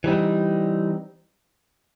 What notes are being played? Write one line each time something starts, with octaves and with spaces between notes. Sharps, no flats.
E3 G3 C4 D#4